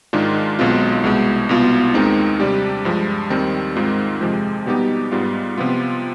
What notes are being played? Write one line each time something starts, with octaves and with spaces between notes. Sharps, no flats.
G#2 D#3 G#3 D4 F4
B1 B2 G#3 C4 F4
C2 B2 G#3
C2 B2 B3 F4
D#2 D#3 G#3 C4 D#4
C3 G3 D4 G4
G2 F3 G#3
D#2 D#3 G3 C4
G#2 D#3 G#3 C4 F4
F2 C3 F3 G#3
B2 G3 B3 D#4 G4
G#2 G3 B3 F4
C3 F3 B3 F4